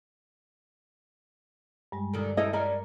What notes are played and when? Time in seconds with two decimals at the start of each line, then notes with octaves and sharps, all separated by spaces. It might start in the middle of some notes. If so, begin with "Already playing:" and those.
1.92 G2 G3 G#3
2.14 D3 D#3 F#3
2.37 D#3 C#4 E4 A4 D#5
2.53 G3 C#4 D4 A#4